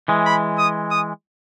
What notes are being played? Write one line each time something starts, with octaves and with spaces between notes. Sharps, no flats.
E3 G#3
B5
D#6
D#6